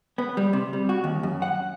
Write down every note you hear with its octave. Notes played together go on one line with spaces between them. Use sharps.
B3
G3
C3
G3
F#4
D#2
F#2
F#5